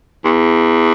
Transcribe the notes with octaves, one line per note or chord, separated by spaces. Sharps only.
E2